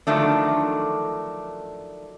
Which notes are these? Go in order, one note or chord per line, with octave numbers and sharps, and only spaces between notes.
D3 D#3 F3 F#3 A3 D4